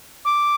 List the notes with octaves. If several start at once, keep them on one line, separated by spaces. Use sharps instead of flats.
D6